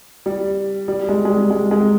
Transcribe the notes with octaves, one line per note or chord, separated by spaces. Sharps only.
G3
G3
G#3
G#3
G3
G#3
G#3